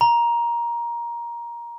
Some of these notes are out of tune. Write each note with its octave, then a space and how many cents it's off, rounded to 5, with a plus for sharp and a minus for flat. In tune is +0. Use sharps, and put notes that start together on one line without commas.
A#5 +15